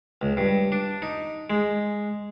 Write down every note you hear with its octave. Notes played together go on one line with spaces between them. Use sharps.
C#2
G2
D4
D#4
G#3